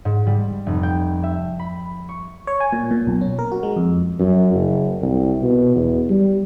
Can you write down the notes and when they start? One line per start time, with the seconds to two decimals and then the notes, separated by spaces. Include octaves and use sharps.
0.05 G#2
0.27 G3
0.66 F1
0.83 G5
1.23 E5
1.59 B5
2.09 C#6
2.47 C#5
2.60 G#5
2.73 A#2
2.91 A#2
3.07 B1
3.21 C#4
3.39 A#4
3.52 F#4
3.63 G#3
3.77 F2
4.19 F#2
4.53 F#1
5.01 C2
5.42 B2
5.75 E2
6.10 G3